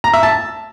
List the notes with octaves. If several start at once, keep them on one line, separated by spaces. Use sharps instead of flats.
A#5
E5
A5